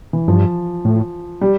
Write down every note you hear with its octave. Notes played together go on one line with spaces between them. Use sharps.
E3
G2 F3
A2
G3